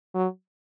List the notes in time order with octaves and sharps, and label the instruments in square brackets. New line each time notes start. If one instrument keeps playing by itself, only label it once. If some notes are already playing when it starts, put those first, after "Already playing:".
[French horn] F#3